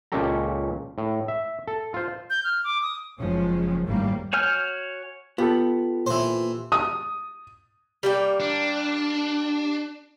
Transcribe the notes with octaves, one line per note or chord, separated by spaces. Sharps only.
C#2 A#2 C#4 G4 A4 A#5
A2
E5
A4
F4 C5
G6
F6
D6
D#6
F#1 F3 G#3 C#4
G#1 F#2 A2 G3 A#3
F#4 C#5 G#5 F6 G6
B3 F4 G4 A4
A#2 E3 C5
D#6
G3 A#3 G5
D4